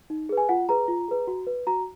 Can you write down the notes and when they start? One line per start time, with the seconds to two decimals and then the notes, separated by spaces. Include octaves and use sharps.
0.10 D#4
0.29 G#4 B4
0.38 G#5
0.49 F4 F#5
0.69 G#4 B4 A#5
0.88 F4
1.08 G#4 B4
1.27 F#4
1.47 B4
1.67 F#4 A#5